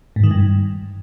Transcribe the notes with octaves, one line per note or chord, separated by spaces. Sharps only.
G#2
D#3
G2